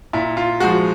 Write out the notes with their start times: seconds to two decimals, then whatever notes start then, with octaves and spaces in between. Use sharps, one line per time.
0.13 A#2 E4
0.37 F4
0.60 G#3 F#4
0.64 F3